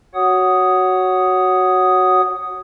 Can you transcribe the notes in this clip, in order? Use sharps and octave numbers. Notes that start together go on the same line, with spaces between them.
F#4 C#5 F#5 D#6